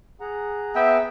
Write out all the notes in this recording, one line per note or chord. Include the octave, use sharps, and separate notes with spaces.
G#4 F#5 A#5
B3 E5 G5